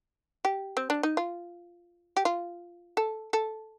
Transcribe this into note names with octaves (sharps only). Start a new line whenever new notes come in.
G4
C4
D4
D#4
F4
G4
F4
A4
A4